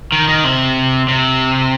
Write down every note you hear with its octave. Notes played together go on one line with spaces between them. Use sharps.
D#3
D#3
C3
C3